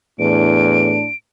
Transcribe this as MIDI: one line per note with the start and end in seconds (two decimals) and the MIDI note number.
0.19 0.95 40
0.19 1.07 45
0.19 1.07 62
0.19 1.16 98